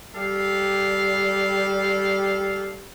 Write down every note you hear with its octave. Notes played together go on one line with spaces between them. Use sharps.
G3 G4 A4 F5